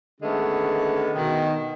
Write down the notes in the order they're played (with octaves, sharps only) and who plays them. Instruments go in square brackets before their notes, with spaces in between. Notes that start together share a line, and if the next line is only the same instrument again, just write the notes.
[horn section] D3 D#3 G#3 A3 B3 C#4
B2 D#3